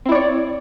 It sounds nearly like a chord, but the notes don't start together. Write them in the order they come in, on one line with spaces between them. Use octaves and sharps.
C4 E4 D5 C#5